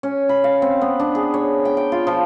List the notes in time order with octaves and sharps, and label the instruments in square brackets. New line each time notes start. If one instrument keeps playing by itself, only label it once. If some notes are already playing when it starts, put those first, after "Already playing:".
[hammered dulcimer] C#4
B5
F5
C4
B3
D4
G#4
C#5
G5
G5
F4
F3